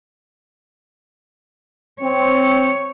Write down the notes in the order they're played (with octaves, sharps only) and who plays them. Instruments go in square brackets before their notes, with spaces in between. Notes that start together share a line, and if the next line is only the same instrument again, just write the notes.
[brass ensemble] C4 [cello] C#5